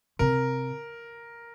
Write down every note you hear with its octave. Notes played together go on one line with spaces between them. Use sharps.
C3 A#4